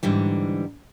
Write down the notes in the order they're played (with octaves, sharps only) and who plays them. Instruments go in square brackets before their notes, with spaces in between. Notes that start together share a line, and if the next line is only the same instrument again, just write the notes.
[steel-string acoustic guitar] G#2 D3 E3 G3